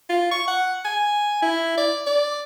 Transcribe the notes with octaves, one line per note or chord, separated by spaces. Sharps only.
F4
C#6
F#5
G#5
E4
D5
D5